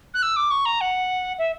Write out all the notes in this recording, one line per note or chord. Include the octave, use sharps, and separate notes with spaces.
F#6
E6
D6
C#6
A#5
F#5
E5